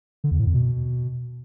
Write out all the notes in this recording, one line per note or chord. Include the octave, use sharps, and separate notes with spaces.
D3
E2
A2
F2
B2